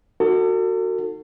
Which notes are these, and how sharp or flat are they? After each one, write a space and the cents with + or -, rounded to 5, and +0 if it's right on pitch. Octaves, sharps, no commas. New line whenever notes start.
D#4 +0 F#4 +0 A4 +40